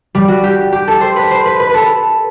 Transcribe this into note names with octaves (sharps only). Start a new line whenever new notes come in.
G3
F#4
G4
G4
A4
C5
B4
C5
B4
B4
A4 B4